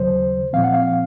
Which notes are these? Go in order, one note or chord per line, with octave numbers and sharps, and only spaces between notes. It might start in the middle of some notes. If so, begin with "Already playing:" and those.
Already playing: D#2 C#3 F#3 C5
A#2 F3 C4 F5
F#5
F5